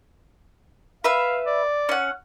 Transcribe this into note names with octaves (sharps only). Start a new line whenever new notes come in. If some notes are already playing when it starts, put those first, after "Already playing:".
B4 E5 F5 E6
D5
C#4 F#5